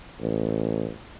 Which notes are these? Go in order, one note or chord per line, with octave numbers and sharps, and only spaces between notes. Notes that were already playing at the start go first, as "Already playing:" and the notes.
A1